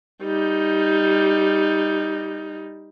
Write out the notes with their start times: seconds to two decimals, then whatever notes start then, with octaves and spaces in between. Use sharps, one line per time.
0.23 G3 D#4